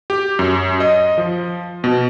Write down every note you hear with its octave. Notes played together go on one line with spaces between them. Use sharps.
G4
F#2
D#5
F3
B2